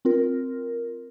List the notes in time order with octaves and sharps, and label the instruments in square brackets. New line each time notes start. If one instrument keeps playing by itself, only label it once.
[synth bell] C4 F4 A#4